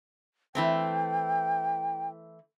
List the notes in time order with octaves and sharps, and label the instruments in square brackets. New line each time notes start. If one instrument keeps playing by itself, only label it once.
[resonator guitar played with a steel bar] E3 A3 C4 [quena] G5